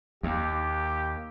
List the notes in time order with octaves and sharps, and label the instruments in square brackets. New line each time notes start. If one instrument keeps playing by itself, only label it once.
[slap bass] D#2 [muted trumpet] G4